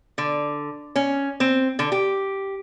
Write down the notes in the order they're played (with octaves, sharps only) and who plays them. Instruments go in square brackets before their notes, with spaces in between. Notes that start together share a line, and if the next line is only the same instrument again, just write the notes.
[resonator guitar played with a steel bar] D3
C#4
C4
D3
G4